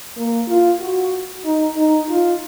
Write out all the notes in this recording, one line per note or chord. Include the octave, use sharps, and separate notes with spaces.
A#3
F4
F#4
D#4
D#4
F4